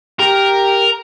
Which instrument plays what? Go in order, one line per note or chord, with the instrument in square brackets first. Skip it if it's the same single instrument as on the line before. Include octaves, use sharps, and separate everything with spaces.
[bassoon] G4 [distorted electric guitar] A#4